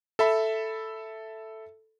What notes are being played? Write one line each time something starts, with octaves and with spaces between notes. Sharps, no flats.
A4 E5 B5